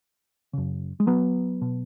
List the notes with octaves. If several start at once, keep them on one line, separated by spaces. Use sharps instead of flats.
F#2 C#3
G#3
F#3 B3
B2